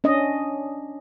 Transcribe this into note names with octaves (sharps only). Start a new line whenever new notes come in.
C#4 D4 D#5